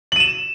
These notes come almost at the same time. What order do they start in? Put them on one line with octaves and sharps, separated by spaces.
F#7 D#7 E7